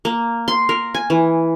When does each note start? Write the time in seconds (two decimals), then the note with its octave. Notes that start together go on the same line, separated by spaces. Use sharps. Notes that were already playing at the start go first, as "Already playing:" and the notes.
0.05 A#3
0.48 C6
0.69 A#4
0.94 G#5
1.10 E3